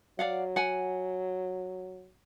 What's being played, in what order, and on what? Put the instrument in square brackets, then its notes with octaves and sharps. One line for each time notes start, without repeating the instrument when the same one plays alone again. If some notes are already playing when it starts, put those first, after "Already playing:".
[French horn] F#3 [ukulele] D5 F5 F#5
[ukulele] F#5 G#5